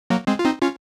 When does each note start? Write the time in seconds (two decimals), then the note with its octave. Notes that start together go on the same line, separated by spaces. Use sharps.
0.10 F#3 A#3
0.27 G#3 C4
0.39 F4
0.44 C4 D#4
0.62 C#4 F4